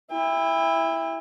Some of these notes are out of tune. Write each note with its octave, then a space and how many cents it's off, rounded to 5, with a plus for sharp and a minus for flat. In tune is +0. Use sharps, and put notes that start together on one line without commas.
E4 +0 G5 +40